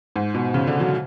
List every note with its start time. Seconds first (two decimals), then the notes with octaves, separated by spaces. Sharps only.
0.16 G#2
0.34 B2
0.54 C#3
0.67 D3
0.80 F#3